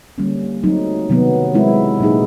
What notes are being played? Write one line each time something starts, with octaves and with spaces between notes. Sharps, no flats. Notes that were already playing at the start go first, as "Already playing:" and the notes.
D3 G3 A#3 C#4
F#3 A3 C4 D#4
C3 D#3 F#3 B3
G#3 C4 E4
A#2 F#3 A#3 D#4 G#4